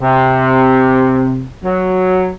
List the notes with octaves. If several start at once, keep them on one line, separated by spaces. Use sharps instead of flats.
C3
F#3